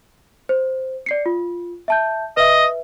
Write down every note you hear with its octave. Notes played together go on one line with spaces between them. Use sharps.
C5
D5 C7 C#7
F4
E5 A5 G6
B4 D#5 E5